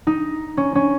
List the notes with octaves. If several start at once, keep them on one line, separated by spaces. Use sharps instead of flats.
D#4
C#4
C#4